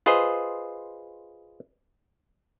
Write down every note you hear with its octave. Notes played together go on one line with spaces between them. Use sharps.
F4 G#4 B4 C5 D#5